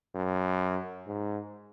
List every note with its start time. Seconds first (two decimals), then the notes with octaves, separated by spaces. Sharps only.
0.15 F#2
1.07 G#2